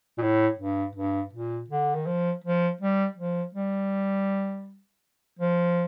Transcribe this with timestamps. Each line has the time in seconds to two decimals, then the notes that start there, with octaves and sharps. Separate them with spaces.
0.18 A#2
0.22 A2
0.59 G2
0.95 G2
1.33 A#2
1.70 D3
1.95 D#3
2.06 F3
2.44 F3
2.81 G3
3.17 F3
3.54 G3
5.39 F3